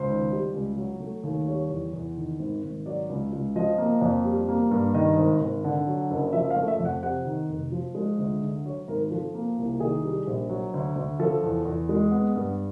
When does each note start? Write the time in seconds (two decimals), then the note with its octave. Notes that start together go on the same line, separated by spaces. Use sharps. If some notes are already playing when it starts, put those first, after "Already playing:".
Already playing: C#2 C5
0.08 D#3
0.32 G3
0.54 C#2
0.77 F#3
1.00 A3
1.23 D#2
1.47 G3 C#5
1.70 E2
1.93 E2
2.17 D#3
2.39 G#1
2.63 G#1
2.86 F#3 D5
3.09 C#2
3.33 C#2
3.56 F3 D#5
3.78 A#3
4.01 F2
4.25 G3
4.49 A#3
4.71 G2
4.94 D#3 D#5
5.17 G#1
5.41 G#1
5.64 D3
5.87 F#3
6.11 F#1
6.33 F3 E5
6.51 F5
6.56 A3
6.68 E5
6.80 F2
6.85 F#5
7.03 C3 F#5
7.26 D#3
7.49 F1
7.72 F3
7.95 G#3
8.18 D2
8.42 D3
8.65 F#3 C#5
8.88 G#1 A#4
9.10 F3 A4
9.35 A#3
9.58 C2
9.80 D#3 G#4
10.04 G3
10.27 A#1
10.49 F#3
10.74 D2
10.96 D2
11.19 F3 A4
11.43 E2
11.65 E2
11.89 G#3
12.12 B3
12.36 G2